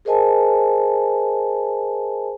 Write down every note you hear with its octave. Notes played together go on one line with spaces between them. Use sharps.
G#4 A#4 C5 D#5 G#5 A5